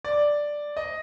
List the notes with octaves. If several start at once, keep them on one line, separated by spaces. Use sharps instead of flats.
D5
D#5